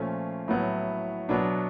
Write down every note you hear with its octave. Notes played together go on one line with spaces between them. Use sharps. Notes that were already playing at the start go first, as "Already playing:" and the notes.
Already playing: A#2 F3 A3 C#4 F4
A2 F#3 B3 E4
B2 F#3 B3 D4